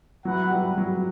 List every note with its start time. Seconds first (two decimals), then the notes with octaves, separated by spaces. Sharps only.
0.25 F#3 E4 B4 F#5
0.51 G3
0.78 F#3